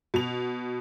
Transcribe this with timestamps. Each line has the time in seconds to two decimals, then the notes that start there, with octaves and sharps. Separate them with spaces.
0.14 B2 F7